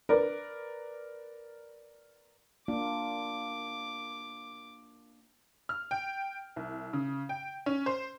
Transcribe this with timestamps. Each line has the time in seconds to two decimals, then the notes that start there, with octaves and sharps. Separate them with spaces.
0.09 A#4 B4 D5
2.68 A#3 D4 F4 D6
5.69 F6
5.91 G5
6.56 C2
6.93 C#3
7.29 G5
7.66 C#4
7.86 C5